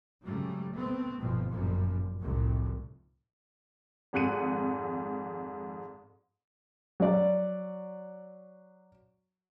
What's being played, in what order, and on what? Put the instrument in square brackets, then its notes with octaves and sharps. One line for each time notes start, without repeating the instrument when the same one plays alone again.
[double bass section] G#2 C#3 F#3 G3 A3
A3 B3 C4
G1 G2 B2 F3
G1 F#2 A#2 F3 G3
F1 C2 A2 C3
[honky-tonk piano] G#1 F2 G#2 F#6 C#7 D#7
[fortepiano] F#3 D5